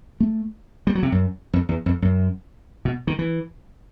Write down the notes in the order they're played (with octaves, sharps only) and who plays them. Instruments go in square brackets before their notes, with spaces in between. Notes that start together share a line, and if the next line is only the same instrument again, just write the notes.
[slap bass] A3
G3
F#3
C3
F#2
F2
E2
F2
F#2
B2
D#3
E3